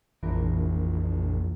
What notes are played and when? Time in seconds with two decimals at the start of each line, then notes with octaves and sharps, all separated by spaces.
0.23 A#1 F2 E3 F3 A#4